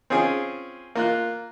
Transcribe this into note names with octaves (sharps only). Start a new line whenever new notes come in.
C4 C#4 F4 G#4
A#3 F4 F#6